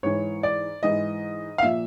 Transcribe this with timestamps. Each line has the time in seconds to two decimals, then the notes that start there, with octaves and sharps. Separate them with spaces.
0.03 G#2 E3 C#5
0.43 D5
0.83 G#2 E3 D#5
1.58 F5
1.62 A#2 F3 E5